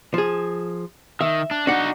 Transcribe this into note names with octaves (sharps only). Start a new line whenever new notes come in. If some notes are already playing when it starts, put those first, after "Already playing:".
F3 G#4
D#3 E5
D4
D4 D#4 F#4 F#5